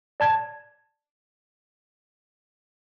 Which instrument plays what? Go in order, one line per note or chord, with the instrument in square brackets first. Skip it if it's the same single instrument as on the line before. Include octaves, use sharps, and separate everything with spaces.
[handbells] D5 A5 G#6